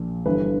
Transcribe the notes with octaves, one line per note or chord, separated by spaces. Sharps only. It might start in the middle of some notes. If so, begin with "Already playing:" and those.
Already playing: A#1 A#2
G1 G2 E3 B4